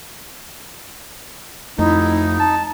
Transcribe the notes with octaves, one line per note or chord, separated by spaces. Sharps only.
F2 A3 D#4 E4
A5